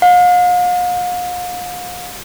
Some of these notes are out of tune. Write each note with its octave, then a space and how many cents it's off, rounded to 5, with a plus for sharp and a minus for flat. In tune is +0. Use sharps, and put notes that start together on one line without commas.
F5 +40